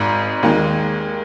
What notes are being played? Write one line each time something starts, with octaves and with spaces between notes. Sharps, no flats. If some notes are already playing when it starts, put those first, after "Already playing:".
Already playing: G#1 G#2
D#2 D#3 G#3